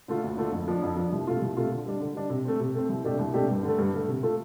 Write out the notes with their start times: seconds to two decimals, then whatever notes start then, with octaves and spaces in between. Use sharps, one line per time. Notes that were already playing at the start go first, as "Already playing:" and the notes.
0.08 D3 A3 F4
0.24 D2
0.37 D3 A3 F4
0.52 F2
0.68 F3 D4
0.82 F2
0.97 F3 D4
1.12 C2
1.27 C3 A3 F4
1.42 C2
1.57 C3 A3 F4
1.71 D3
1.86 G3 D4
2.01 D3
2.15 G3 D4
2.30 C3
2.45 A3 C4
2.60 C3
2.75 A3 C4
2.89 C2
3.04 C3 A3 D4 G4
3.19 C2
3.34 C3 A3 D4 G4
3.49 G2
3.63 D3
3.68 A3
3.79 G2
3.94 D3 A3
4.08 C3
4.23 A3 F4 A4